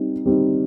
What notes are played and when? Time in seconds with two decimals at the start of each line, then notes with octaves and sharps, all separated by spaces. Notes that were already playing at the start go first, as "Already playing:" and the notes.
Already playing: G3 C4 D#4
0.26 G3 C4 D#4